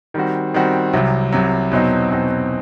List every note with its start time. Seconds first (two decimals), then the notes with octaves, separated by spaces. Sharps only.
0.14 D#3 G3 C4 F#4
0.54 D#3 G3 C4 F#4
0.93 C2 C3 F#3
1.32 C2 C3 F#3
1.71 E2 B2 F#3 C4 D#4
2.11 E2 B2 F#3 C4 D#4